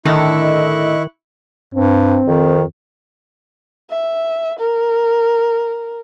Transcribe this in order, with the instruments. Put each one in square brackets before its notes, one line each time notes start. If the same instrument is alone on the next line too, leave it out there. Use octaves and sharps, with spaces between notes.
[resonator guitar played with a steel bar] A2 D3 A4 [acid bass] D#3 [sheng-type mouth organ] E4 C#6 F#6 [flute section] D#5
[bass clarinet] G2 [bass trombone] C4
[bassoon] F2 [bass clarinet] D#3
[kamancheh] E5
A#4